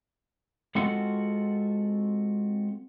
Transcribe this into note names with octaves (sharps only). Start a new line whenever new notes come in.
G#3 C4 F4 F#4 A4 F#5